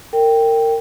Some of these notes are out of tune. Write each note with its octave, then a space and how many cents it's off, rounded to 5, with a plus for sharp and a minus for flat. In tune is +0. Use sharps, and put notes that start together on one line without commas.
A#4 -30 G5 +0